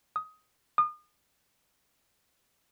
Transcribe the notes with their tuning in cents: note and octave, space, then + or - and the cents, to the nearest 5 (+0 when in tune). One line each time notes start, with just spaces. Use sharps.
D#6 +15
D#6 -35